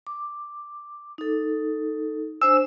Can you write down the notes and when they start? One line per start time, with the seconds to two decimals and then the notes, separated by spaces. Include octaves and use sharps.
0.07 D6
1.18 D#4 A4
2.42 D4 C5 G#5 E6